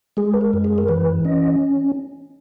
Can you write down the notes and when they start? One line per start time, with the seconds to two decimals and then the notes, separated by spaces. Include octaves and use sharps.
0.17 G#3 G#4
0.34 B4
0.41 A#4
0.53 F#2
0.64 G#4
0.78 A#4
0.88 E3 B4
1.25 C#4 D#5